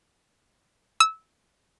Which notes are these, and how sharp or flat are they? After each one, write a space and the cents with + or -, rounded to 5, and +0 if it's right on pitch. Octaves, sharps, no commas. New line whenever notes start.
E6 -20